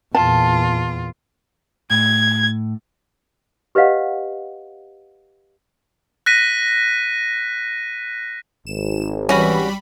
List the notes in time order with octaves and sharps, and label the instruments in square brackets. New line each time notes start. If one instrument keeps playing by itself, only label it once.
[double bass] E2 A#2 [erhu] F4 [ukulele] A5
[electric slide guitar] A2 [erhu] G#6
[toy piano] G4 B4 C#5 D#5 F5 F#5
[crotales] F#6 A#6 B6 D#7
[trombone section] G#1 [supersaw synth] E7
[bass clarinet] E3 [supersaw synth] G3 B5 [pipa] C#4 F#4